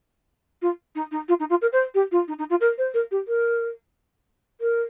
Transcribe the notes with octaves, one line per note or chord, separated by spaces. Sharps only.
F4
D#4
D#4
F4
D#4
F4
A#4
C5
G4
F4
D#4
D#4
F4
A#4
C5
A#4
G4
A#4
A#4